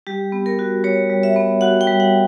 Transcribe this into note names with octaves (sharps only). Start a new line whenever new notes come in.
G3 G4
B3
A#4
F#4
G3 C#5
G3
E5
B3
F#4 F#5
G5
G3
F#5